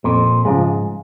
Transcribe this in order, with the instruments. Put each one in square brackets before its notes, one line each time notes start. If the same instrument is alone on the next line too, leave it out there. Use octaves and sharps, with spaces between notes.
[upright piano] F2 [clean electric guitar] A#2
[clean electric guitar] G#2 [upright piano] C#3 F3 G#3